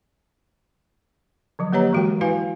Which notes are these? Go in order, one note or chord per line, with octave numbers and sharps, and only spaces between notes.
D3 F3 F#3
A#3 G4 B4 C#5 D#5 A#5
E3 G#3 F#4 A#4 G5
E4 F#4 B4 F5 G#5